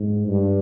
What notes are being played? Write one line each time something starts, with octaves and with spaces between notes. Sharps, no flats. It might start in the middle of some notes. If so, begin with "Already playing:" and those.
Already playing: G#2
G2